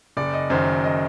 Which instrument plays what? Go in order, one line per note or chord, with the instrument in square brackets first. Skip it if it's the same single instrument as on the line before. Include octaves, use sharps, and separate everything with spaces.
[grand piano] F#1 D5
D#5
F#2 D#3 C5
D#5